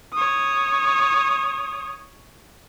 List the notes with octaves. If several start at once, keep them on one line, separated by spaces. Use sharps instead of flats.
C#5 D#6